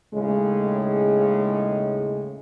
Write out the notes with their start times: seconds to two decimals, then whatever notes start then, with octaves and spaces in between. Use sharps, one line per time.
0.14 D#2 A2 C#3 G#3